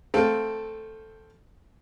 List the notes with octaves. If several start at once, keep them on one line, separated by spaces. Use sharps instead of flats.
A3 C4 A4 F5